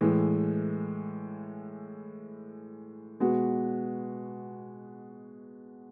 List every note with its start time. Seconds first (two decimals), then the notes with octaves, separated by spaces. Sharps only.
0.01 A2 E3 G#3
3.20 B2 G#3 B3 F#4 B4